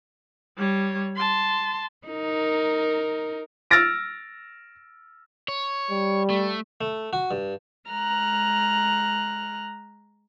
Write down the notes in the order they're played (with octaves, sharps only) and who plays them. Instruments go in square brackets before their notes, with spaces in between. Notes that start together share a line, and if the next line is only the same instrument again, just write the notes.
[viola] G3 C#5
A5 C6
[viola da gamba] D#4 A#4
[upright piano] E6 F6 A6 A#6 D7
[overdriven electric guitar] C#5
[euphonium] G3
[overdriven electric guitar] A3
[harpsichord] A3
F#4
G2
[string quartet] G#3 A#5 F6 F#6